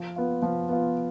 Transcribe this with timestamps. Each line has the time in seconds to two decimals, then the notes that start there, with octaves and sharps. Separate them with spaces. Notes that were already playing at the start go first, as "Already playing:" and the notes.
Already playing: F3
0.16 B3 F4
0.42 F3
0.69 B3 F4